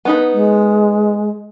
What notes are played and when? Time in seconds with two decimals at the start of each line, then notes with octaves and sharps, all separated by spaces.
0.05 B3 D#4 B4
0.33 G#3